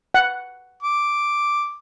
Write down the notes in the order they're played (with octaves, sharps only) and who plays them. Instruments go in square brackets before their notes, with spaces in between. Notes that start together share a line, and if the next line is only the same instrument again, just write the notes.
[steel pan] F#5
[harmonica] D6